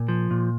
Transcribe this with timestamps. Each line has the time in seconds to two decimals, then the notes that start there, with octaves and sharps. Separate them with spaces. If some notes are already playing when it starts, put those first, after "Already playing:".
Already playing: A#2
0.08 F3
0.31 A#2